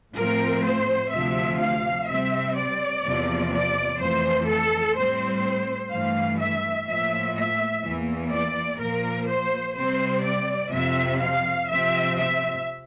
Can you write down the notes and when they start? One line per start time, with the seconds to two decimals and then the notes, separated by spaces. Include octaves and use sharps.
0.16 A2 F3 A3 C4 A#4
0.63 C5
1.11 D2 C3 F3 E5
1.60 F5
2.08 C3 G3 C4 E5
2.56 D5
3.05 E2 C3 F3 A#3
3.52 D5
4.00 F2 E3 A3 C5
4.48 A4
4.96 A2 G3 C4 C5
5.92 G2 E3 A3 F5
6.40 E5
6.88 A2 F3 A#3 E5
7.36 E5
7.85 E2 E3 A#3
8.33 D5
8.80 A#2 F3 A#3 A#4
9.28 C5
9.76 C3 G3 C4 C5
10.24 D5
10.73 F2 C3 F3 E5
11.20 F5
11.68 C3 F3 C4 E5
12.17 E5